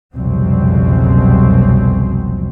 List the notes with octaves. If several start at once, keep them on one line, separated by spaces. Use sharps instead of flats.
F#1 C2 F2 B2 F#3 C4